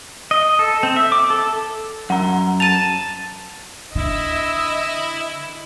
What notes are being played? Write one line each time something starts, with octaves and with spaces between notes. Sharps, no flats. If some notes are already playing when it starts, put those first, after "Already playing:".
D#5
A4
C4
E5
D6
A4
F#2 F#5 A#5
A5 A6 D#7 F7
D3 E4 D#5 E6